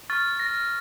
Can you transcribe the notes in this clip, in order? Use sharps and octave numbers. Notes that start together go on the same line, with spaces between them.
C#6 F6 A6
A#6